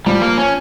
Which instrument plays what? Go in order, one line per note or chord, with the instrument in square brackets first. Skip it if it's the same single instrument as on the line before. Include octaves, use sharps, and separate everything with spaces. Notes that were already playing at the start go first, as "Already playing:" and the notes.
[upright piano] F3 [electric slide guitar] G3
[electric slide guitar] A#3
C#4